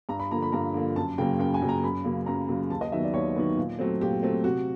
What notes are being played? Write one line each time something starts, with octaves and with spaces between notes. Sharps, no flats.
G2 A#5
B5
D3 F3 A#3 A#5
B5
G2 A#5
D3 F3 A#3
F#2 A5
C#3 F#3 A#3 G5
F#2 G5
G#5
C#3 F#3 A#3
A#5
F#2 B5
C#3 F#3 A#3
F#2 A#5
C#3 F#3 A#3
D#2 A5
D#5
D#3 F#3 B3 E5
D5
D#2 C#5
D#3 F#3 B3
A#2
F#3 A3 C4
A#2 G4
F#3 A3 C4
C3 F#4